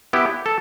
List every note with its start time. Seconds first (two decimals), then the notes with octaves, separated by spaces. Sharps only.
0.13 B3 E4 G4
0.46 A4